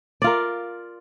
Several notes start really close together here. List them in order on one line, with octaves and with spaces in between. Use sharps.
D5 F4 A#4